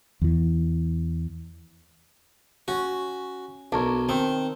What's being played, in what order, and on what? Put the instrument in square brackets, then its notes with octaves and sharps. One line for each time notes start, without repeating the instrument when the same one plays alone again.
[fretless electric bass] E2 E3
[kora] C#4 [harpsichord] F#4
[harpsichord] B1 [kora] D4 A#4 C#5
[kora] D#3 [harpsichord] C4